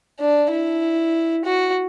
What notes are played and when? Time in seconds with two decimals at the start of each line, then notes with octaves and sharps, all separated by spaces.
0.20 D4
0.51 E4
1.45 F#4